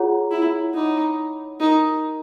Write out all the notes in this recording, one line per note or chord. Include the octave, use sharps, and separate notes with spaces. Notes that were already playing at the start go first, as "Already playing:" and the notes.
Already playing: F4 G#4 C#5 F#5 A#5
E4
D#4 C#5 F#5 B5 D6
D#4 G4 A#4 D#5